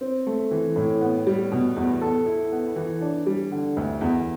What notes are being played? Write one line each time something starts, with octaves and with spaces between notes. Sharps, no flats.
C4
A3
E3
A2
B3
G3
B2
E2
A4
E4
B3
E3
D4
G3
D3
D2
E2